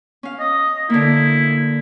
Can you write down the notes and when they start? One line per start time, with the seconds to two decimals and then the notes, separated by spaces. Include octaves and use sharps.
0.23 C#4 F5
0.39 D#5
0.90 D3 A#3 E4